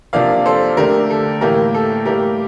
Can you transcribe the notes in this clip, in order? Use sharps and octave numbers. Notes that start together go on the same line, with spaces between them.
C3 F3 A#3 D4 D5 F5
A4 C5
D3 A3 D4 G4 A#4
A4
A2 E3 A#3 G4 A#4
A4
A2 G3 A#3 G4 A#4